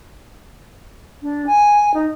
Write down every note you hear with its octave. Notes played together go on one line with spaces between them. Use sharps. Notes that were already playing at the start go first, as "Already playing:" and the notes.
D4
G#5
D#4